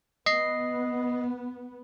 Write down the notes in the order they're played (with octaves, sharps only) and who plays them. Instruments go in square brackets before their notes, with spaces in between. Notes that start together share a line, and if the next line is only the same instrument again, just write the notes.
[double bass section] B3 [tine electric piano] D#5 C7